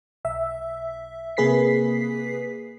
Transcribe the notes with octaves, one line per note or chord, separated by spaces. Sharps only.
B1 E5
C3 A#3 G#4 B4 B6 C7